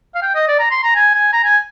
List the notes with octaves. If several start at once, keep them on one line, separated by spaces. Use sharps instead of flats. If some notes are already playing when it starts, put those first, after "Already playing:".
F5
G5
D#5
D5
A#5
C6
A#5
G#5
G#5
A#5
G#5